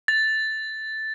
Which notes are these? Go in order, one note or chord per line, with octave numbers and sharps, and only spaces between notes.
A6